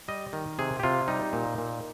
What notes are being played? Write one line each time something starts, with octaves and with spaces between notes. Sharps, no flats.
G3 D#5
D#3
C3 G#4
G4
C3 F4
G3 D#4
A#2
A#2